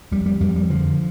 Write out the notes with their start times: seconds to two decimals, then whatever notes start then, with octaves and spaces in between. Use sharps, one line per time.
0.12 F2 G3
0.26 G3
0.41 F2 G3
0.56 G3
0.70 D3 F3